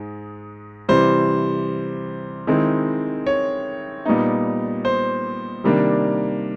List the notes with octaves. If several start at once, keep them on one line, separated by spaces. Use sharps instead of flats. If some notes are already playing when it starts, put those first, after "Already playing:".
Already playing: G#2 G#3
C3 E3 G3 C5
D#3 G#3 C4 E4
C#5
A#2 G3 B3 D#4
C5
C3 D#3 G3 A#3 D4